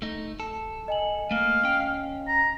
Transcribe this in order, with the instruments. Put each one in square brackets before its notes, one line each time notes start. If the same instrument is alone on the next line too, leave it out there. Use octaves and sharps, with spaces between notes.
[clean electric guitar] A3 D#4
A4
[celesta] D#5 G#5 F#7
[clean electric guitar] A3 A#3 [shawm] F5
[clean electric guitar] C#4 G5
[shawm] A#5